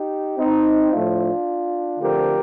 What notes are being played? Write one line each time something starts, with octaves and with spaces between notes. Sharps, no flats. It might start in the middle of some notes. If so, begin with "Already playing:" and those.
Already playing: D#4 G4
C4 D#4
A2 F3 A3 D4 F4
D3 F3 A3 C4 G4 A#4